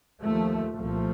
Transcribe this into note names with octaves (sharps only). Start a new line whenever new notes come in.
D#2 F3 A3
C2 A#2 F3 A3